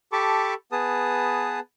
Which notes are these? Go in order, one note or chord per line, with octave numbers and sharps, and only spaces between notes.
G4 A4 A5 B5 C#6 D6
B3 G#4 B4 A5 D#6